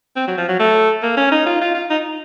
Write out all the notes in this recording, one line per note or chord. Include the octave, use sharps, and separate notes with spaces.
C4
F#3
F3
F#3
A3
A#3
C#4
D#4
F4
F4
F4
D#4